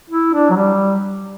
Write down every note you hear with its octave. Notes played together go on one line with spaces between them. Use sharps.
E4
D4
F#3
G3